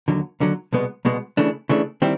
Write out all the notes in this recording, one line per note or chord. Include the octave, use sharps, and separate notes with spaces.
D#2 D3 F#3
D#2 D3 F#3
C2 B2 G#3 B3
C2 B2 G#3 B3
C#3 E3 A3 D4
C#3 E3 A3 D4
D#3 G3 C4 E4